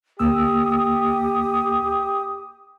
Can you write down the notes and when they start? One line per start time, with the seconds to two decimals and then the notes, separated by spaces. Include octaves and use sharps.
0.20 D2 A#3 G4 D#6 E6